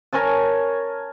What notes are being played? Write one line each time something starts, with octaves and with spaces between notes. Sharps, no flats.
A#4 C#5 G#5 A5